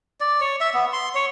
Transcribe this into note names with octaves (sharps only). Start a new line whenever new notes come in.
D5
C#5
E5
B3
C6
C#5